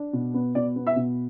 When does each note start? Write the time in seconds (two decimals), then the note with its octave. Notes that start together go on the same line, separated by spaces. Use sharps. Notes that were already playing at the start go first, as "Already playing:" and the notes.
Already playing: D4
0.13 B2
0.34 B3
0.55 B2 D5
0.76 B3
0.87 E5
0.96 B2